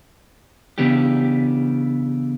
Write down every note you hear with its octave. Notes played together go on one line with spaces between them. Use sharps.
C#3 E3 B3 D4 G4